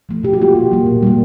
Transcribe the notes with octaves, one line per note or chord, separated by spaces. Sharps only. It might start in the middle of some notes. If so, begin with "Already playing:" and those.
F3 A3
B2 G4
F#4
F#3 A#3 F4 G4
B2
F#3 A#3
A#2
G3 A#3